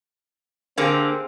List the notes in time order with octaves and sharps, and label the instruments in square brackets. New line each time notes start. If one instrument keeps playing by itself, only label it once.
[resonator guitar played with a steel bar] D3 A#3 [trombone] C4 [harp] G4 G#4 F5